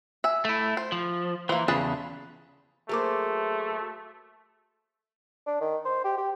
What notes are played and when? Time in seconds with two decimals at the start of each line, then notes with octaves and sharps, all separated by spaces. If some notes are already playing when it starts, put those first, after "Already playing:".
0.24 E5 G#5
0.45 A3 E4
0.77 C5
0.92 F3
1.49 E3 A#3 C5
1.68 E2 C#3 G#4 B4 A5
2.89 F#3 A3 A#3 G#4 C5 D6
5.46 D4
5.60 D#3
5.85 C5
6.04 G4
6.18 G4